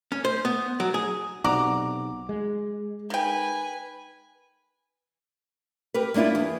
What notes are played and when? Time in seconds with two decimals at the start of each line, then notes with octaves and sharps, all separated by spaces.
0.12 C#4
0.25 C5
0.45 B3
0.80 F#3
0.94 G#4
1.44 B1 C3 F#4 D5 A#5 D6
2.29 G#3
3.10 D#3 B4 G5 G#5
5.94 G4 A#4 B4
6.14 G#3 A#3 D4 E4 F4
6.35 E2